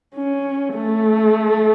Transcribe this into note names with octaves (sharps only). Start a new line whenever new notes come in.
C#4
A3